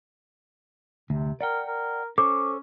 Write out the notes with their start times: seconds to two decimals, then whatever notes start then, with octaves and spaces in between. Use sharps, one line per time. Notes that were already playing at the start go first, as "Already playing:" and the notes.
1.10 D2 C3
1.41 A#4 D5 F#5 G5
1.67 A#4
2.18 C#4 A4 C5 C#5 D6